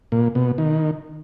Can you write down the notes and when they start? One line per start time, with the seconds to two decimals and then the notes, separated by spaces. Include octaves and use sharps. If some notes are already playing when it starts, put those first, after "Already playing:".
0.12 A#2
0.35 B2
0.58 D#3